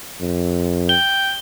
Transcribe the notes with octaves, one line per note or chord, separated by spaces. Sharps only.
F2
G5 G7